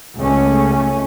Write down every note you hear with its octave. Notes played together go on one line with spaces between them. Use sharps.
C#2 A3 C#4